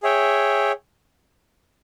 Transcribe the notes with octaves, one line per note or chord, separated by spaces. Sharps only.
G#4 C#5 E5 G5